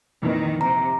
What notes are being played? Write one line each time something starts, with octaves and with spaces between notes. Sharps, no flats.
F2 A#2 D#3 E3
C3 A#5